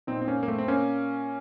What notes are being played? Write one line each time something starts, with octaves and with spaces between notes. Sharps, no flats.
A#2 C4 D#4
C4
A#3 C#4
A#3
A3 C4
C4
A#3 C#4